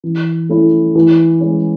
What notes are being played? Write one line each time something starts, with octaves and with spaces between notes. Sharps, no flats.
E3
A3 C#4 E4
E3
G#3 C#4